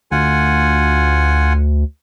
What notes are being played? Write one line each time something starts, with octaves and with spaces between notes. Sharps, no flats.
D2 F4 F#5 G#5